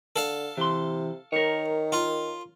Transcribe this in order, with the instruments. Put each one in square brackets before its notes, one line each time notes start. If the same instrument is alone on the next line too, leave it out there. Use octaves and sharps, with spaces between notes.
[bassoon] D3 [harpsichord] A4 F5
[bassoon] C3 [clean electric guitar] E3 C6
[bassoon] D#3 [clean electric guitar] A#4 C#5
[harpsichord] F4